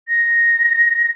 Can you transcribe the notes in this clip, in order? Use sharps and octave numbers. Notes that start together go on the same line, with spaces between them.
A#6